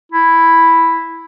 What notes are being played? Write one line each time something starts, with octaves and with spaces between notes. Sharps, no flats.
E4